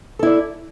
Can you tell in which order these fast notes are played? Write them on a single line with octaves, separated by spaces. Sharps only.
A4 E4 D5